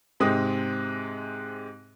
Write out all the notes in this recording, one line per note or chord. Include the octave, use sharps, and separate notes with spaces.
G#2 C3 G#3 C4 D#4 D#6